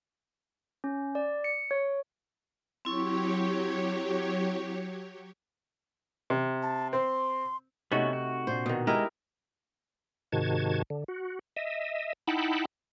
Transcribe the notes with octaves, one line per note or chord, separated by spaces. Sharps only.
C#4
D5
C#7
C#5
F#3 C4 E4 G4 C#5 C#6
C3
A5
C4 C6
C3 A3 B3 C#4 D#4 F#4
F#4
A#2 D4 C5
B2 D#3
G#3 D#4 E4 G4 A#4
G#2 C3 D#3 F#4 A5 G#6
D3
F#4
D#5 E5
D#4 E4 F#5 G5 A5 B5